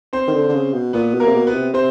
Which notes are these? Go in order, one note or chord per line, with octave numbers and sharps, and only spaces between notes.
C4 C5
D#3
D3
D3
C#3
B2
A#2 B3 B4
B2
A#3 A#4
C3
B2
B3 B4
C3
C3 C4 C5